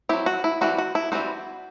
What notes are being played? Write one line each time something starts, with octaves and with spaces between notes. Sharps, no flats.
F#3 C4 E4 G4
F#4
E4
E3 G3 C4 F#4
F#4
E4
E3 G3 C4 F#4